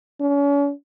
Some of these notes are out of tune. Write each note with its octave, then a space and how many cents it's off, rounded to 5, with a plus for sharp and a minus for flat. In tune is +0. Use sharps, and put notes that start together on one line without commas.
C#4 +40